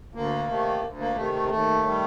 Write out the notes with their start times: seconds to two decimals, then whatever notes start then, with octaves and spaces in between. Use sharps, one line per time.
0.14 D2 A#3
0.48 C3 D#3 A3
0.82 D2
0.99 A#3
1.15 C3 D#3 A3
1.32 A3
1.49 D#2 A3
1.83 D#3 G3